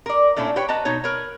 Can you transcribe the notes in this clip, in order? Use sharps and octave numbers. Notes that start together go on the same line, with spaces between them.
A#4 D5
A#2 A3 C#4 D4 E4
G4 B4 C#5 G5
B4 D#5 A5 A#5
B2 D#4 C#5
A#4 B4 C#5